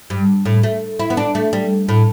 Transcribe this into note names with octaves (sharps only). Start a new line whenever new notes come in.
G2
A2
A3
E4
B3
D4
A3
G3
A2